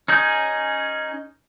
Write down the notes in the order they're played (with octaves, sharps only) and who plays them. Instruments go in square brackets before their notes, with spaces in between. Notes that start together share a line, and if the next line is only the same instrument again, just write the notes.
[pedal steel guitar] C#4 D#4 G#4 G6